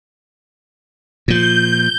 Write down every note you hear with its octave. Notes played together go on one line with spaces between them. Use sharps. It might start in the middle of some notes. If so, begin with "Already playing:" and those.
A#2 F3 G6